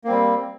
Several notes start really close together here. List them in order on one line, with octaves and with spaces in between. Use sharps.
A#3 C4 G3